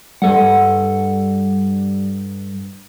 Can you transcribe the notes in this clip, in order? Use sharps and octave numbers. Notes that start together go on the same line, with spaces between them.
G2 G3 A4 F#5